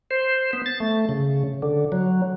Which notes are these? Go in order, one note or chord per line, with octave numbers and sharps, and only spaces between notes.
C5
B3
A6
A3
C#3
D3
F#3